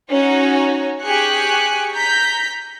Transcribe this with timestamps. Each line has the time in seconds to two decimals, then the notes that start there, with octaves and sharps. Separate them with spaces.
0.10 C#4 D#4 F#4 C#5
1.02 G4 G#4 G#5 C#6 F#6 C#7
1.93 A#5 G6 B6